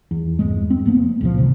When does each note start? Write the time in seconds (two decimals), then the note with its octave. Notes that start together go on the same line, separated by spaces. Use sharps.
0.11 E2
0.39 G1 E2 G#3
0.70 C4
0.86 F1 A#3 B3
1.21 C#2 A#2 F3
1.38 G1 C3 D#3